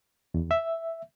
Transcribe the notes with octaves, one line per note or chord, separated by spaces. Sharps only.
E2
E5